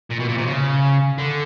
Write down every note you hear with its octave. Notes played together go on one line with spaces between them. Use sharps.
A#2
B2
A#2
C3
C#3
D3